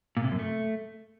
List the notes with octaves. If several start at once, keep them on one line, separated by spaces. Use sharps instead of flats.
A#2
C3
F#2
A3